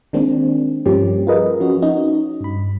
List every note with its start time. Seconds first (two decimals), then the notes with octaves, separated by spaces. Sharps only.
0.13 D#3 G#3 A#3 C4 D4
0.86 G2 F3 G3 A#3 C#4 G4
1.27 F4 G#4 A#4 B4 D#5
1.60 F3 C#4 F#4
1.82 C#4 D#4 C#5 D#5
2.41 G2 B5